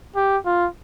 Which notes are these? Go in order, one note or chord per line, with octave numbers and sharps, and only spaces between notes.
G4
F4